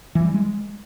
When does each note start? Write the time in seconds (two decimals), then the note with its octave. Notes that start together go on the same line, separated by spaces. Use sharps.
0.15 E3
0.25 G3
0.34 G#3